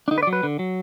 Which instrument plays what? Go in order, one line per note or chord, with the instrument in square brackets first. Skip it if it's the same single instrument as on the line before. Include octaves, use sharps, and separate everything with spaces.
[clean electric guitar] D4
D3 D#4
B4
D5
F#3
B4
D3
F#3